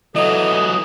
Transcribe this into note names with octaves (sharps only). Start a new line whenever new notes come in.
E3 F#3 A4 D#5 D#6